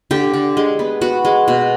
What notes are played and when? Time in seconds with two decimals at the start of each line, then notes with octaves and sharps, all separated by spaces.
0.11 D3 G4
0.34 D3
0.57 G#3
0.79 B3
1.01 B3 F#4
1.25 G#3
1.48 B2